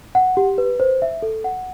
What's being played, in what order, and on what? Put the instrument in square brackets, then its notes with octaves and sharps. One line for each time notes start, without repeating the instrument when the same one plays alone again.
[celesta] F#5
G4
B4
C5
E5
A4
F#5